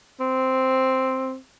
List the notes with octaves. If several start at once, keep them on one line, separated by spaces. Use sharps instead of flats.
C4